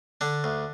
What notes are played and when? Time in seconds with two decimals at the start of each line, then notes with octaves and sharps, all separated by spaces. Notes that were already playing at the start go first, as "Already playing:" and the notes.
0.21 D3 D4
0.44 D2